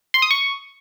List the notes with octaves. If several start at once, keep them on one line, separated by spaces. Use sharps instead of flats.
C6
D#6
C#6